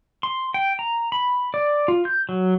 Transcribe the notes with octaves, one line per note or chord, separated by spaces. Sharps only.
C6
G5
A#5
B5
D5
F4
G6
F#3